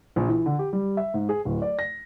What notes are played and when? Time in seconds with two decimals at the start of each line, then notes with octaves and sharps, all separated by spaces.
0.16 A#1
0.28 E3
0.46 D3
0.59 G4
0.73 G3
0.97 E5
1.14 G#2
1.29 G#4
1.45 D1
1.62 D5
1.79 A#6